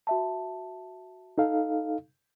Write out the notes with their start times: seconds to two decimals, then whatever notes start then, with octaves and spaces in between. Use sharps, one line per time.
0.07 F#4 E5 A5
1.38 D#4 A4 F5